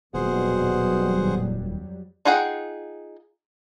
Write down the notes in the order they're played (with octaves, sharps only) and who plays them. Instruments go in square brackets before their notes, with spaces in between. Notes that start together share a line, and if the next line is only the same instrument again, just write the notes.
[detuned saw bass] D#1 [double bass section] F2 F#3 G3 [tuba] B2 [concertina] G#4 C5 F#5
[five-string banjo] D#4 F4 G#4 F#5 G5